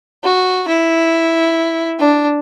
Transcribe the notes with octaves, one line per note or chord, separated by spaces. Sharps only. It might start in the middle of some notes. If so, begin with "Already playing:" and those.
F#4
E4
D4